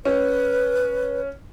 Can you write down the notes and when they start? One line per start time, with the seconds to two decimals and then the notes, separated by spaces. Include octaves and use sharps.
0.05 C#4 B4